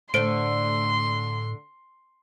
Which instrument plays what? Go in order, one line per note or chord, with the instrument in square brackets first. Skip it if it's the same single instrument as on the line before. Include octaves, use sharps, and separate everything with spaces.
[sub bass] A2 [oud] D3 A3 [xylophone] C5 D7 [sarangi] C6